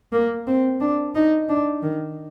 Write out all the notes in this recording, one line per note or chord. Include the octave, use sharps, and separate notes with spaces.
A#3
C4
D4
D#4
D4
D#3